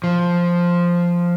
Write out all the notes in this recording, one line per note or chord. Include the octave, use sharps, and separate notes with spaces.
F3